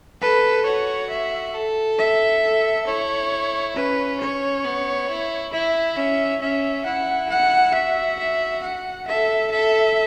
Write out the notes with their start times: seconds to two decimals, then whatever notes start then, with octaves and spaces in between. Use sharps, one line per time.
0.21 A4 B4
0.66 F#4 C#5
1.10 E5
1.54 A4
1.98 E5
2.42 A4
2.87 E4 C#5
3.76 C#4 B4
4.20 C#5
4.64 B3
5.09 E4
5.52 E4 E5
5.97 C#4 E5
6.41 C#4 E5
6.85 E4 F#5
7.30 F#5
7.74 F#4 E5
8.19 E5
8.63 F#5
9.07 A4 E5
9.51 A4 E5